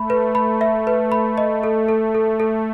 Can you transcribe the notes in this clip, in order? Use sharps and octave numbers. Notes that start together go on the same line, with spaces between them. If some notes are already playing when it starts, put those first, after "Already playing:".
Already playing: A3 B5
B4
B5
E5
B4
B5
D#5
A4
A4
A4
A4